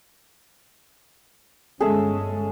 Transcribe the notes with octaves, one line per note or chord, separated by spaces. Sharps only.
G1 G#3 C#4 G#4 A4 E5